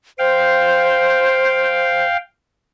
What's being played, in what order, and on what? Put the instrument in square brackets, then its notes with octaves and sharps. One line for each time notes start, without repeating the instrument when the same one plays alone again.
[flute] C5 [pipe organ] F5 G5